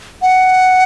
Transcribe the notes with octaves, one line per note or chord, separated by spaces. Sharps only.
F#5